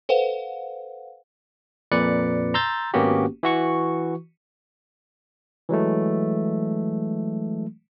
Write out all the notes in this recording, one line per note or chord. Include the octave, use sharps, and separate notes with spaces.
A4 B4 C5 F5 F#5
F2 A#2 B4 D5 C#7
A#5 C6 E6 G6 A6
G#1 A#3 B3 C#4 F#4 G4
E3 F#4 C#6
E3 F#3 G#3 A3